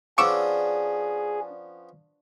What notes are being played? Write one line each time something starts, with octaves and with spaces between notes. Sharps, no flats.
F3 B3 C#4 D4 G#4 C#6 D6 E6